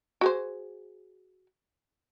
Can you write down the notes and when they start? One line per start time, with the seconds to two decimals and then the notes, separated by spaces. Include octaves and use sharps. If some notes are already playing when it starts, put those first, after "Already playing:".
0.21 F#4 G#4 C5